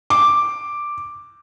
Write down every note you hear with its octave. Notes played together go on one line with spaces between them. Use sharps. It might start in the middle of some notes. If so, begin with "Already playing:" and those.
D6